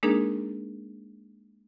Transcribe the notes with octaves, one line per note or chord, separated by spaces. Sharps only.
G#3 A#3 D4 D#4 G#4 A#4